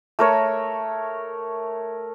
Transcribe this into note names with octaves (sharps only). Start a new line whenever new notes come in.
A3 A#4 C#5